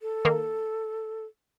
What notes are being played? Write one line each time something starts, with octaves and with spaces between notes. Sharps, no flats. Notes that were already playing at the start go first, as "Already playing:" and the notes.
A4
D#3 A#3 A#4